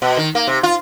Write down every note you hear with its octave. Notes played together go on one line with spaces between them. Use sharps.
B2
D#3
A#3
C3
F4